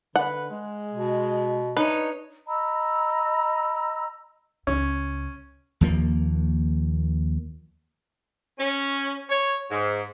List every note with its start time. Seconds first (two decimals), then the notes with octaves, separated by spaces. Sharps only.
0.16 D3 B4 F#5
0.50 G#3
0.93 B2
1.77 D4 D#4 B4 C#5
2.48 D#5 A#5 B5 E6
4.67 C#2 C#3 C#4
5.81 D#2 F3 A#3
8.58 C#4
9.29 C#5
9.70 G#2